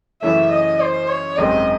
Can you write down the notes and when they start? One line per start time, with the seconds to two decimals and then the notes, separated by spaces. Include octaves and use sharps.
0.22 F#2 C#3 E3 A3 C#4 E5
0.51 D#5
0.80 C5
1.09 C#5
1.37 G#1 F#2 D#3 G#3 C4 D#5